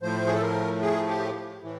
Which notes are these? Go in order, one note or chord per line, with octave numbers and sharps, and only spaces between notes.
A2 F3 A3 C5
G#4
A4
A#4
G#4
G4
A2 E3